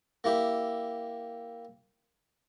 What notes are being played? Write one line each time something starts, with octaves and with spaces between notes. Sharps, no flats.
A#3 E4 G4